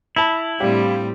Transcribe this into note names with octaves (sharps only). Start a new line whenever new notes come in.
E4 A5 B5 F7
A2 G3 C4 D4 G4 F5